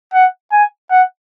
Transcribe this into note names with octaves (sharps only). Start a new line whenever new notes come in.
F#5
G#5
F#5